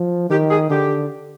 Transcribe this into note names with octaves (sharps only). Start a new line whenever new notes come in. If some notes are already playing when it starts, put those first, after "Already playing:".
Already playing: F3
D#3 G4
G#4
D3 G4